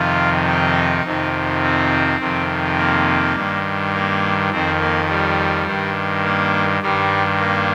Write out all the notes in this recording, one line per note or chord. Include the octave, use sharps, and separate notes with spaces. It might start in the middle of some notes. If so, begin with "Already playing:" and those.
Already playing: F2 C3 D#3 F4
D#4
F2 C3 D#3
C4
F2 C3 D#3
A#3
G2 D#3
A#3
F2 D#3 C4
A#3
G3
G2 D#3
A#3
G2 D#3 G3
A#3